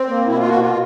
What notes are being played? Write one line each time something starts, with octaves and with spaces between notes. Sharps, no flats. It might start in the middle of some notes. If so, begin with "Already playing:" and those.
Already playing: C4
A#3
B2 E4
F4
A#3
F#4
B2 F4